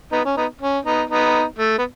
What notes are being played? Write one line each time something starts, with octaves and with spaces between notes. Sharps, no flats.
B3 D#4
C#4
B3 D#4
C#4
B3 D#4
B3 D#4
A3
B3